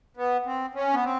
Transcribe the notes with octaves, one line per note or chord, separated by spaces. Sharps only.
B3
C4
C#4
B3
C4